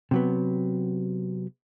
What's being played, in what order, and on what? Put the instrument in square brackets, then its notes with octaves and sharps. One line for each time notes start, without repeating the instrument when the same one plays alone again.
[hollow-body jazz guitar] C3 F#3 B3